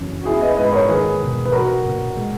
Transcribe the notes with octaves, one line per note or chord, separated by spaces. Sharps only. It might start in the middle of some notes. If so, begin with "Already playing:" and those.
Already playing: F#1 F#2 E3
F#4
B3 E4 G#4
B4 D#5
G#2 B4 D#5
A#4 C#5
D#3 G#4 B4
E1
B4
F#3 F#4 A#4
A#1
G#3